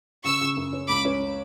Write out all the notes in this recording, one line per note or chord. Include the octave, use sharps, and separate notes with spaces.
C#3 C#6 E6
C#3
F#2
C#4
C#2 B5 D6
C#4